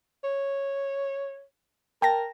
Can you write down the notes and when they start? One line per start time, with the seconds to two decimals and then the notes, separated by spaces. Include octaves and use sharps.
0.24 C#5
2.02 A#4 G5 A5 A#6